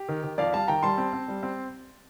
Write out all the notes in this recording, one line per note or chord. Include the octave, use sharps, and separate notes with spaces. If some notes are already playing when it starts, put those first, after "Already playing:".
Already playing: G4
D#3
D#3
F2 D5 F5
G3 F5 A5
D#3 G5 A#5
G3 A5 C6
C4
C4
G3
C4